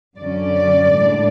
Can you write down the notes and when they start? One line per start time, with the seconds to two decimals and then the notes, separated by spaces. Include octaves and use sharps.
0.18 F#2 D3 F#3 C#4 D5
0.91 A2 G#3 D4